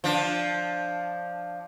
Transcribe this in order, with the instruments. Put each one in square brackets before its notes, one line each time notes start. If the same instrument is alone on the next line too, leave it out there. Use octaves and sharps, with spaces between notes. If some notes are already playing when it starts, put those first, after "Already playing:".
[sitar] F3 D4